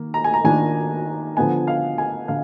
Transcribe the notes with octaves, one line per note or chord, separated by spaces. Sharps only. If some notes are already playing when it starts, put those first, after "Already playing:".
Already playing: D#3 A#3
A#5
G#5
A#5
D#3 A#3 D4 F4 G#5
D3 F3 B3 G#5
F5
G#5
D3 F5